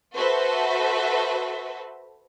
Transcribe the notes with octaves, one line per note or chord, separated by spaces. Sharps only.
F#4 A4 B4 C5 E5